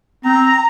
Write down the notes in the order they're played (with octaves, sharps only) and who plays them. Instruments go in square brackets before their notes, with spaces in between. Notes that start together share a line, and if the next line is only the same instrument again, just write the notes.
[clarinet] C4 [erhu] A#5